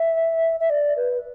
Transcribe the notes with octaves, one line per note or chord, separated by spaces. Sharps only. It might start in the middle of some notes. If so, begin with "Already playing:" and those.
Already playing: E5
E5
D5
B4